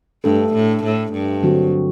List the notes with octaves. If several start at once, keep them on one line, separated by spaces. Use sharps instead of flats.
G2 A3 D4 A4
A2
A2
G2
D3 F#3 C4 F#4